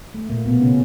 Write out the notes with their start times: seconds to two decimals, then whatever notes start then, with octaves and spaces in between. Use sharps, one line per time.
0.14 A3
0.29 A#2 A#3
0.45 B2 B3
0.60 C#3 C#4